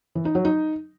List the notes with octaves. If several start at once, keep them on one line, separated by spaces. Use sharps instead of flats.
E3
D#4
F#3
D#4